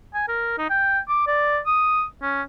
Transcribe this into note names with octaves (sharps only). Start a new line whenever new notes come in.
G#5
A#4
D#4
G5
D6
D5
D#6
C#4